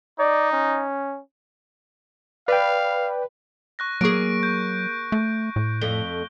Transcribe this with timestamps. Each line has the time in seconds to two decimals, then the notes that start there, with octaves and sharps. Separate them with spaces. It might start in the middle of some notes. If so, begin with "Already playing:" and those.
0.19 D#4 D5
0.52 C#4
2.48 B4 D5 F5 G5
3.79 C#6 F#6 A#6
4.01 F#3 A#3 G#4 C#6 D7
4.43 G6
5.12 A3
5.56 A2
5.81 F2 A3 G7